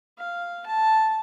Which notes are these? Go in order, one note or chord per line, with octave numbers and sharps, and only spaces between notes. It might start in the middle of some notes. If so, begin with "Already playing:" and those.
F5
A5